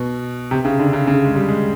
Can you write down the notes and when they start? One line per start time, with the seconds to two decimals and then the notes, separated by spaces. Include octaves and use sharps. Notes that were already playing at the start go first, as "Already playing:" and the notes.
Already playing: B2
0.51 C3
0.65 C#3
0.79 D3
0.93 C#3
1.07 C#3
1.24 G#3
1.36 G3
1.49 G#3